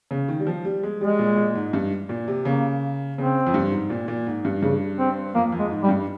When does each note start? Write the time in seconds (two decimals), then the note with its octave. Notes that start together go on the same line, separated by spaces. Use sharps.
0.11 C#3
0.28 D#3
0.40 G3
0.47 F3
0.65 G3
0.83 G#3
1.01 G3 G#3
1.19 A#2
1.37 A#2
1.55 G#2
1.73 G2
2.09 A#2
2.28 C3
2.45 C#3 A#3
3.18 C#3 C4
3.47 F2
3.54 G2
3.72 G#2
3.90 A#2
4.08 A#2
4.27 G#2
4.45 G2
4.62 G2 C#3
4.98 C4
5.35 F2 A#3
5.52 F2
5.59 G#3
5.71 G#2
5.83 G3
5.89 G2